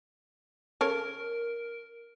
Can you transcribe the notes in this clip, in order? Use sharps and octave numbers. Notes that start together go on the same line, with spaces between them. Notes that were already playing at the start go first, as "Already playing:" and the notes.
C#3 A4 A#4 C#5